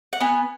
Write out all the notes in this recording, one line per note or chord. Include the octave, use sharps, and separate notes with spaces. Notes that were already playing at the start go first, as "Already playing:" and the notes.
F#5
B3 G#5